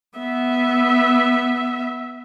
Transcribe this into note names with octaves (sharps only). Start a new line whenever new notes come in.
B3 E5